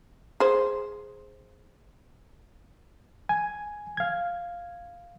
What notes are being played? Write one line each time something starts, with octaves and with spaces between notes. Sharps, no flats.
G#4 C5
G#5
F5 G#6